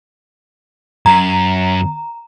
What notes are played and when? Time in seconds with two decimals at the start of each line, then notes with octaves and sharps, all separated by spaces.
1.06 F#2 A#5